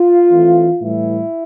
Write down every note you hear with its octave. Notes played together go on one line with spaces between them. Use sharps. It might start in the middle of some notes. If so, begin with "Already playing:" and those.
Already playing: F4
E3 A3 C4
A2 E3 G3 E4